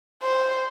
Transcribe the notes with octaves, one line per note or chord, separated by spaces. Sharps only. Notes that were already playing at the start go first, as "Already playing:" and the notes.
C5